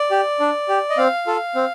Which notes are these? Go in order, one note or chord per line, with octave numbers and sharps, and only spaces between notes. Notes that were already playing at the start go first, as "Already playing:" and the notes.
Already playing: D5
G4
D4
G4
D#5
C4 F5
F4 A4
C4